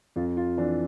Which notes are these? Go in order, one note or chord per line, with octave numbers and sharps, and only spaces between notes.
F2 F4
F4
E3 D4